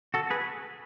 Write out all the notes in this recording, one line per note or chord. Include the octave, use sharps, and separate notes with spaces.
F#4 A4
G#4 B4